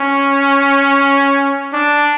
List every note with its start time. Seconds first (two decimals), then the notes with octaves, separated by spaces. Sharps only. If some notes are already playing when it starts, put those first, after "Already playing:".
Already playing: C#4
1.73 D4